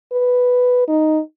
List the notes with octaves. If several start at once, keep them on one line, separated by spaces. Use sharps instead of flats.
B4
D#4